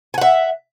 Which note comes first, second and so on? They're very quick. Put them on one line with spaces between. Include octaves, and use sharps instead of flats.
G#5 F#5 E5